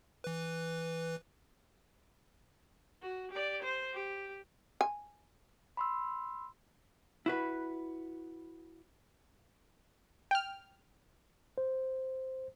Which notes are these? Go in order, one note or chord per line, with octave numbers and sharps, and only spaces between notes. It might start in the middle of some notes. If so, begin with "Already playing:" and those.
E3 B4
F#4
G4 D5
C5
G4
G#5
B5 C6 E6
E4 F#4 B4
G5 F6
C5